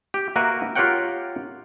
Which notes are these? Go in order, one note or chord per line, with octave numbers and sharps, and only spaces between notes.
G4
A#3 F#4 A#4 B4 E5
F4 G4 A#4 C#5 F#5 G5